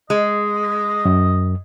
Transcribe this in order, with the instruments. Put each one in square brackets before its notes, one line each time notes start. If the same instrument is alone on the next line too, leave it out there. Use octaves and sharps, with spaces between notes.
[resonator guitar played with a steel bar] G#3 [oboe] D#5
[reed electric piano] F#2